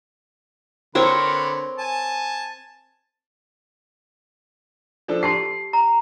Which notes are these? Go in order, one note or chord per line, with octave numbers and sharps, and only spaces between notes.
D3 C4 A#4 B4 C#5
G#5 A5
F3 D4 A4
G4 A5 C6 C7
A#5